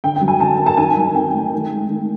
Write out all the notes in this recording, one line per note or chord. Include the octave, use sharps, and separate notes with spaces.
D3 G5
G5
F#3
G#5
D3 A5
A#3
A5
D#3 G#5
F#3
C4 G5
A3
D#3
G#3
D#3